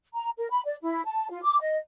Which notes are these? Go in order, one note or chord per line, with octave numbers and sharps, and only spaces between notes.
A#5
A#4
B5
D5
E4
A5
F4
D6
D#5